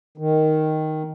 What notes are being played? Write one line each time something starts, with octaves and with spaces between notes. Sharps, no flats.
D#3